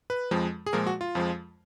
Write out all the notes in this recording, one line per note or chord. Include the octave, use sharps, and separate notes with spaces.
B4
F2 F3 G#3
G#4
A#2 F3 G#3 A#4
F#4
F4
F2 F3 G#3